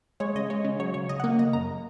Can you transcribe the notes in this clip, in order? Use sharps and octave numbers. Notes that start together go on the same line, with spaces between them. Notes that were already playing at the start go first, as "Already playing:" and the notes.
G#3 C#5
C#3 D#5
G#3 C#5
C#3
F#3 C#5
C#3 C#5
C#3 D#5
F#5
A#3
C#3 D#5
F#2 A#5